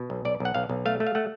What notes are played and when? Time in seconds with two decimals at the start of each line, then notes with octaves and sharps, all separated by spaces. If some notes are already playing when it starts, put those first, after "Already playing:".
Already playing: B2
0.10 B1
0.25 B1 D5
0.40 B1 F#5
0.55 B1 F5
0.70 B1
0.86 A3 F5
1.00 A3
1.07 F5
1.15 A3 F#5